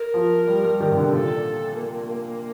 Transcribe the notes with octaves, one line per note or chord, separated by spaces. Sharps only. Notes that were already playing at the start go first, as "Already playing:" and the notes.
Already playing: A#4
F3
G3
G3
D#3
C3
D3
A#2 A4
A#3